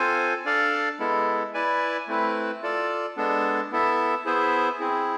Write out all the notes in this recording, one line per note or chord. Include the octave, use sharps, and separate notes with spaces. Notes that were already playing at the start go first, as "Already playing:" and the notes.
Already playing: C4 F4 A4 C5 G#5
D4 A4 D5 F5
G#3 B3 E4 A4
E4 B4 D5 G#5
A3 C4 E4 B4
F4 A4 D5
G#3 B3 D4 A4
B3 E4 A4 E5
B3 E4 G#4 C5 E5
C4 E4 G#4